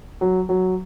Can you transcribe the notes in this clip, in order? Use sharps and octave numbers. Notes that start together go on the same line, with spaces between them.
F#3
F#3